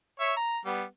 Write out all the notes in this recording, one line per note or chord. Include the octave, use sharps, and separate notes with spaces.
C#5 E5
A#5
G3 B3